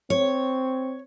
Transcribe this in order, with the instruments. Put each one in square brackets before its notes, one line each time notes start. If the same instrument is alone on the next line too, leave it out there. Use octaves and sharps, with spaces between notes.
[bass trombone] C4 [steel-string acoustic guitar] C#5